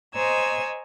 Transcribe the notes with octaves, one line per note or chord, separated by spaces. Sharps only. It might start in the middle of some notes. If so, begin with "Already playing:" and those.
C5 C#5 D#5 G#5 A#5 E6